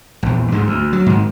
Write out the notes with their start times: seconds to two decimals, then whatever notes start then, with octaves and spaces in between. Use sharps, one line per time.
0.23 A#1 E2
0.51 D2 G#2 G#3
0.67 D2
0.93 F#3
1.06 G#2 D#3